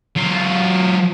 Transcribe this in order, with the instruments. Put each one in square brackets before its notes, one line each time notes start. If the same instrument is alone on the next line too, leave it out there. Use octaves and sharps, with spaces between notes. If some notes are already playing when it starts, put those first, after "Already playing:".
[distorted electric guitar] F#3 F4